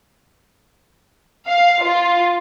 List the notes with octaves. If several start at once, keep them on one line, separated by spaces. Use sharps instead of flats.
F5
F4